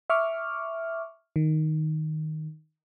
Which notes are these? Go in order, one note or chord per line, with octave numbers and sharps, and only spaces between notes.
E5 C#6 D6 F6
D#3